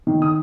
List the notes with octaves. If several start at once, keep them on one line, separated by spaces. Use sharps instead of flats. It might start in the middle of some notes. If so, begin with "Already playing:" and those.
D#3
D#6